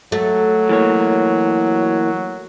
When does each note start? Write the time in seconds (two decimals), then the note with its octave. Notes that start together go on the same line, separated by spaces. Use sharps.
0.12 F#3 A3
0.69 E3 A#3 C#5